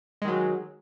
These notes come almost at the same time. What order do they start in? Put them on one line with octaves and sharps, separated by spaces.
G#3 D#3 F#3